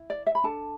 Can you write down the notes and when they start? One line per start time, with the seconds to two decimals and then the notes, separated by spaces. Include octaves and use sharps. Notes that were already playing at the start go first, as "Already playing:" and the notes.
Already playing: E4
0.10 D5
0.27 E5
0.35 B5
0.44 D4 A4 A5